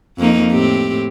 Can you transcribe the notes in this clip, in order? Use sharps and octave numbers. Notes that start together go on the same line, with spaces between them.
F2 A#3 D#4
A2 C4 G4